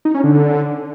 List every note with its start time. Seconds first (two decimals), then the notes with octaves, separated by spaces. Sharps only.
0.05 D#4
0.14 C#4
0.24 D3